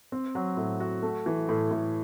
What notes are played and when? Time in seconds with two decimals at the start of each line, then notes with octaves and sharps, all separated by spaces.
0.12 C4
0.35 F#3
0.57 A2
0.80 F#4
1.03 A3
1.26 E3
1.49 A2
1.71 A2